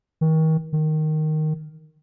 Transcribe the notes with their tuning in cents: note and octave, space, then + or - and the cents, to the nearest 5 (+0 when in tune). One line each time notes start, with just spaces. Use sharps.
D#3 +35
D#3 -5